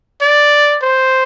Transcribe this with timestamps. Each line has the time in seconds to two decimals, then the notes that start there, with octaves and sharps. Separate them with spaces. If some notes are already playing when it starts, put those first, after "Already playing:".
0.22 D5
0.83 C5